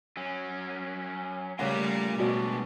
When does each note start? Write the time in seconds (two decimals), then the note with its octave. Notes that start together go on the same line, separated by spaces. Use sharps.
0.17 F#3 C#4
1.59 C#3 G3 A3 F4 A#4 C#5 F#5
2.20 B2 G#3 D4 F#4 D5